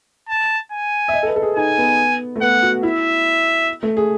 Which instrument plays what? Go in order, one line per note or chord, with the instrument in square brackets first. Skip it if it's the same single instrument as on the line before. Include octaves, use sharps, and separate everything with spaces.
[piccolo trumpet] A5
G#5
[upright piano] E5
D#5
A4
B4
A4
G#4
[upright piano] D#4 [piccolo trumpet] G#5
[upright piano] B3
A3
[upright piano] B3 [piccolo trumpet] F#5
[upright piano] F#4
[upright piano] E4 [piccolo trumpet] E5
[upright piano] A3
G#4